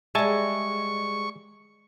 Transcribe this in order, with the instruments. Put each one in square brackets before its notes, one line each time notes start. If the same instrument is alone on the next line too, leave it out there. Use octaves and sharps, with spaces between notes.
[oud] G3 G#3 [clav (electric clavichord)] E5 G#5 A5 [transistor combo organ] C#6